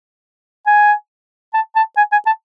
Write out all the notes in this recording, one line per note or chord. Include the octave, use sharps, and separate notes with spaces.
G#5
A5
A5
G#5
G#5
A5